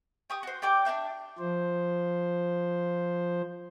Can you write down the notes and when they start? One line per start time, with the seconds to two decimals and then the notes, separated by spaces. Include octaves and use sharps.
0.30 G4 C#6 D#6
0.43 F#4 C5
0.62 G4 D5 G5 D6
0.85 D4 B4 E5 G6
1.39 F3 C5